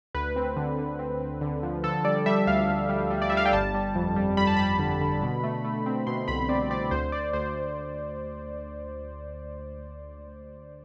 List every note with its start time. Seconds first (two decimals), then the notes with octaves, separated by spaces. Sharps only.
0.15 D2 B4
0.36 C4
0.57 D3
0.78 D3
0.99 C4
1.20 C4
1.41 D3
1.63 F3
1.84 D3 A4
2.04 G3 D5
2.26 G3 E5
2.47 D2 F5
2.68 D2
2.89 G3
3.10 G3
3.22 D5
3.30 G3 E5
3.37 F5
3.45 G5
3.53 G1 A5
3.74 G3
3.95 F2
4.16 G3
4.37 G3 B5
4.47 A5
4.57 G3 B5
4.80 D3
5.01 D3
5.22 B2
5.43 A3
5.64 A3
5.86 C4
6.07 B2 C6
6.28 C2 B5
6.49 C4 D5
6.70 C4 D5
6.91 D2 C5
7.12 D2 D5
7.33 D2 C5